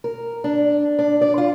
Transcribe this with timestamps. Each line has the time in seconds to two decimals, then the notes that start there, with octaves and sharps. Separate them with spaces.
0.04 A#4
0.44 D4
0.99 D4
1.21 D5
1.38 F4